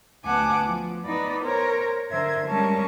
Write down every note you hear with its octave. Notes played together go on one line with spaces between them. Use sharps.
D2 B3 F#5 G#5 A5 D6
F3
B3 D#4 D5 B5
A#4 C5 C#5 A#5
D3 A#4 C5 E5 G#6
G3 G#3 C#4 A#4 A5 C#6